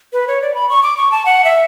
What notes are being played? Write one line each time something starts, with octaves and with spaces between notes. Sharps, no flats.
B4
C#5
D5
B5
C#6
D6
C#6
A5
F#5
E5